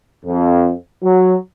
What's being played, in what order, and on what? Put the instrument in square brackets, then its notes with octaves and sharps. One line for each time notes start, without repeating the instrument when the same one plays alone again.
[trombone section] F2
F#3